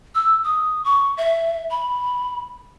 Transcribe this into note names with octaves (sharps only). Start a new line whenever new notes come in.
E6
D#6
C#6
E5
B5